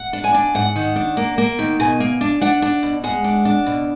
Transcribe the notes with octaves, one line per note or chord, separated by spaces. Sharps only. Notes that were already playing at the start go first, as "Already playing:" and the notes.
Already playing: F#5
D4
G#5
D4
G#2 F#5
D#3
D4
A#3
A#3
D#3
B2 G#5
A#3
D4
D4 F#5
D4
B2
G#3 F#5
D4
D4
B2